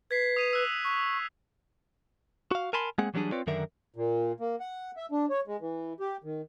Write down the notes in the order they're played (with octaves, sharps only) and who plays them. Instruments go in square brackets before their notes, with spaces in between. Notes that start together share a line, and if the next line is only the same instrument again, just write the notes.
[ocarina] B4 [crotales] G#6 B6 C7
[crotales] D#6 D#7 F7
E6 F#6
[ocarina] C#6
[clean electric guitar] F#4 F5
A#4 G#5 A5 B5 C6
G#3 A#3 C4 G#4 F#5
E3 F#3 G3 A3 D4 G#4
C4 F4 B4 C#5 D5
F#2 D3 D#3 D4 A#4 E5
[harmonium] A#2
A#3
F#5
E5
D4
C#5
G#3
E3
G4
D#3